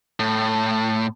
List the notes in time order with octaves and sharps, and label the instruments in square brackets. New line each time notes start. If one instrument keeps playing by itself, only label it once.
[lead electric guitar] A2